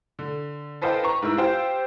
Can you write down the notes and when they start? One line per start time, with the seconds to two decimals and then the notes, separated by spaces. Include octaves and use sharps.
0.19 D3
0.82 A4 B4 C5 D#5 F5 G5
1.03 B4 A#5 C#6
1.22 G#2 E4 A#4 E6
1.37 F4 G4 C5 F5 G5